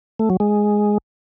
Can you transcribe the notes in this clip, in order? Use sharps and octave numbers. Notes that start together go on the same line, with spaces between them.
A3
F#3
G#3